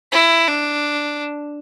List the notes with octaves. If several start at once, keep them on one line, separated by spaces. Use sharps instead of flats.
E4
D4